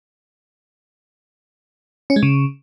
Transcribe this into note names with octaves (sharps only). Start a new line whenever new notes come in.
C#4
G#3
C#3